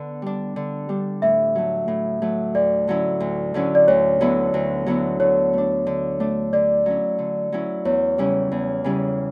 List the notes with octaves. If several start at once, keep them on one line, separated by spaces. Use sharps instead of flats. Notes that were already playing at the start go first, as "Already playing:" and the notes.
Already playing: D3 B3
G3 D4
D3
G3 D4
A2 E5
F#3 A3
A2
F#3 A3
D2 D5
D3 F#3 C#4 E4
D2
D3 F#3 C#4 E4
D5
D2 C#5
D3 F#3 B3 E4
D2
D3 F#3 B3 E4
D3 C#5
A3 D4
D3
A3 D4
D3 D5
F#3 C#4 E4
D3
F#3 C#4 E4
E2 C#5
C#3 G3 C#4 E4
E2
C#3 G3 C#4 E4